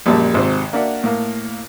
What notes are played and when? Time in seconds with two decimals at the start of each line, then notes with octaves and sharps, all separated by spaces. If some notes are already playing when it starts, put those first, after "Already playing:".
0.06 A#1 F#2 A#2 G3 G#3 A5
0.34 G#1 G#2 C3 C4
0.73 A#3 D4 F#4 E5 F#5
1.04 A2 A#3